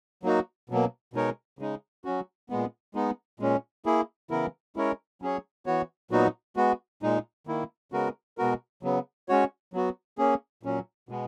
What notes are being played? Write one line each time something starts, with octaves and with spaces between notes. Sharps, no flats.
F#3 A#3 D#4 F#4
B2 F#3 A#3
B2 G#3 D#4 A#4 C#5
C#3 G#3 D#4
F#3 C#4 F#4
A#2 G#3 B3
G#3 B3 D#4
A#2 G#3 C#4
A#3 E4 G#4
C#3 E3 B3 E4 A#4
G#3 C#4 E4 A#4 C#5
F#3 C#4 G#4 C#5
E3 B3 F#4 C#5
A#2 F#3 B3 D#4 F#4
G#3 B3 F#4
A#2 G#3 D#4
D#3 A#3 E4
C#3 G#3 B3 F#4 A#4
B2 G#3 B3 F#4 A#4
C#3 F#3 B3
G#3 C#4 F#4 C#5
F#3 B3 F#4
A#3 C#4 G#4
A#2 F#3 C#4
B2 G#3 B3